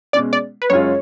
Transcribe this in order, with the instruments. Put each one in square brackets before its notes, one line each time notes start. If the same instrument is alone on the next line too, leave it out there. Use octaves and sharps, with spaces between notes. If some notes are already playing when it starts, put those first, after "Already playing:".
[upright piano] B2 G#3 C#4 [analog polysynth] D5
[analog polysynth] D5
B4
[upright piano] F#2 C#3 G#3 C#4 F4 [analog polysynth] C#5